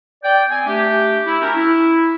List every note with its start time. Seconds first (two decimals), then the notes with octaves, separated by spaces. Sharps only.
0.23 D5 G5
0.49 C4 G#5
0.66 A3 D4 G4
1.26 E4
1.41 C#4 D4 F#4 G4 A#4
1.55 E4